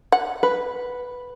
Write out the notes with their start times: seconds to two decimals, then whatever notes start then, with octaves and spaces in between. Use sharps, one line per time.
0.12 F#5
0.43 B4